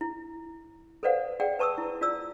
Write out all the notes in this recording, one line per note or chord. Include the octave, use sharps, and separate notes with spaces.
E4
A4 B4 C5 D5 F5 F#5
G#4 D5 F#5 G5
B4 A5 C#6 D#6 E6
E4
F4 D5 E6